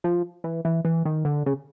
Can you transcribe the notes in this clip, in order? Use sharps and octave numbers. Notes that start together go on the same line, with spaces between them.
F3
E3
E3
E3
D#3
D3
C#3